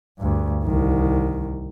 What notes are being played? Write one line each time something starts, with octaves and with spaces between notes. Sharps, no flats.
D2 G2
C2 D#3